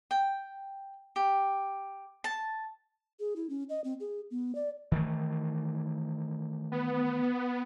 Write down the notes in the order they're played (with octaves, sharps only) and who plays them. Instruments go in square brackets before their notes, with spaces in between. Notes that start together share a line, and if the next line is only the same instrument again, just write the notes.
[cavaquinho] G5
G4
A5
[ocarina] G#4
E4
C#4
D#5
C4
G#4
B3
D5
[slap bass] D#3 E3 A3
[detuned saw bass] B3